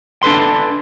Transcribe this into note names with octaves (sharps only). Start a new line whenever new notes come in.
D4 A4 B4 C6